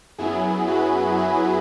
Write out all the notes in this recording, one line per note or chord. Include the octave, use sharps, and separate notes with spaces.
F#2 F#3 B3 E4 G#4
F#4 B4
E4 G#4